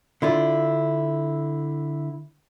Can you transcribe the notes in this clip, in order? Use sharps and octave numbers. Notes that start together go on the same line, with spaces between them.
D3 E4 F4